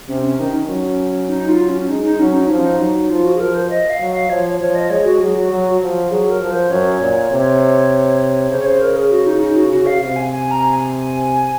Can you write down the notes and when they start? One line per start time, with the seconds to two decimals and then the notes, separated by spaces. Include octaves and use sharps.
0.09 C3 C#4
0.23 C#4
0.39 D#3 D#4
0.53 C#4
0.68 F#3
1.29 D#4
1.49 F4
1.69 C#4
1.89 G#3 D#4
2.05 D#4
2.19 F#3 C#4
2.34 D#4
2.47 F3 C#4
2.61 D#4
2.79 F#3
3.10 F3 F4
3.25 F#4
3.36 G#4
3.39 F3 A#4
3.54 C5
3.70 D#5
3.90 F5
4.00 F#3
4.10 F5
4.29 F3 C#5
4.45 C#5
4.59 F3 C#5
4.75 D#5
4.90 G#3 C#5
5.05 F#4
5.20 F#3 G#4
5.35 F#4
5.50 F#3
5.80 F3
6.10 F#3 G#4
6.30 A#4
6.41 F3
6.51 C5
6.70 F#2 C#5
7.01 A#2
7.31 C3
8.50 C#3 C5
8.59 C#5
8.66 C5
8.81 A#4
8.96 G#4
9.11 F#4
9.26 D#4
9.42 D#4
9.56 F#4
9.71 C#3 F#4
9.86 F5
10.01 C3 F5
10.16 G#5
10.32 G#5
10.51 A#5
10.71 G#5